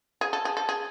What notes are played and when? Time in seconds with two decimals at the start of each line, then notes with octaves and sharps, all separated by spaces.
0.21 G#4
0.33 A4
0.45 G#4
0.57 A4
0.69 G#4